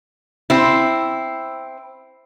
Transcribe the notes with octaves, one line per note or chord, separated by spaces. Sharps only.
C4 E4